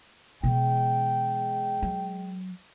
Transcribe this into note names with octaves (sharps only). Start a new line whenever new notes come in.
B2 E3 G#3 G5
F#3